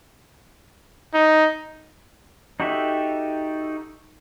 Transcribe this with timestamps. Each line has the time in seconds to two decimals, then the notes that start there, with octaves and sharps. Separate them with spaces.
1.15 D#4
2.60 D#4 F#4 G4 A4 E5